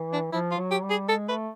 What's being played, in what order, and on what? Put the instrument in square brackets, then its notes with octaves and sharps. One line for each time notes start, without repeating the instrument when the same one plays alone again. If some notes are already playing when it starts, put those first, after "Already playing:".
Already playing: [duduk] E3
[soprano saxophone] D4
[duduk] F3 [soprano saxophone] E4
[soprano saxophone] F4
[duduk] F#3
[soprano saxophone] G4
[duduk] G3
[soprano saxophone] G#4
[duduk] G#3 [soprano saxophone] A4
[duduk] A3 [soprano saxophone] B4